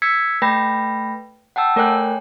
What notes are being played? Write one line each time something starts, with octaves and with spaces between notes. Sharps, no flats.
E6 G#6 B6 C#7
A3 B4 G5 B5 A#6
F#5 G5 A5 E6
A3 A#4 C#5 G5 G#5 F#6